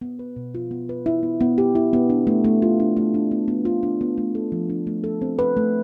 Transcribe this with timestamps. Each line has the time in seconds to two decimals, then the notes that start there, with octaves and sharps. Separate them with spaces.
0.01 B3
0.19 B4
0.36 B2
0.55 F4
0.71 B3
0.89 B4
1.06 E4
1.23 B3
1.41 B3
1.58 G4
1.75 E4
1.93 B3
2.10 D4
2.27 A3
2.44 A3
2.62 F4
2.80 D4
2.97 A3
3.14 D4
3.31 B3
3.48 B3
3.65 F4
3.83 D4
4.01 B3
4.18 A3
4.35 A4
4.52 F3
4.70 D4
4.87 A3
5.04 A4
5.22 C4
5.39 B4
5.57 A3